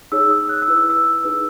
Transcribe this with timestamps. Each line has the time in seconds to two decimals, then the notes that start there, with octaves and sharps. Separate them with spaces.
0.12 D#4 G#4 C#5 E6
0.31 D#6
0.49 F#6
0.62 E6
0.68 E4 B4
0.76 D#6
0.90 E6
1.23 D#4 G#4 B4 E6